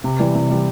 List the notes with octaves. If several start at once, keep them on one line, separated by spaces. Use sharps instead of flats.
C3
E3 G3
C3
E3 G3